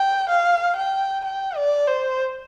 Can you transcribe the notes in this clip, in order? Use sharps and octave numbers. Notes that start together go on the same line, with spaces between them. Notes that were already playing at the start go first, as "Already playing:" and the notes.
Already playing: G5
F5
G5
G5
D5
C5